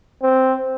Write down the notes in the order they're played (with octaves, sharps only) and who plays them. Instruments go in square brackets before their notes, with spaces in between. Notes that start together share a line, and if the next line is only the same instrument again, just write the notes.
[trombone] C4